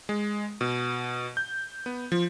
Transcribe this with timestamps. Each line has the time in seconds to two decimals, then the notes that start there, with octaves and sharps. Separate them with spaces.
0.09 G#3
0.61 B2
1.37 G6
1.86 B3
2.12 F3